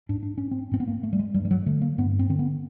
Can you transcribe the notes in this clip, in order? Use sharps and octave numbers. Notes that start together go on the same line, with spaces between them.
G#2 D4
D4
C#4
C4
G#2 C4
B3
A#3
A3
G3
G#3
G2 G3
G3
F#3
D3 A3
A#3
G2 B3
C4
D3 C4
B3